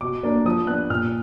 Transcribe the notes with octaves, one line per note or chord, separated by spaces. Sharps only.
B2 D6
A#3 D4
F3 D#6
B3 D4 F#6
A#2 F6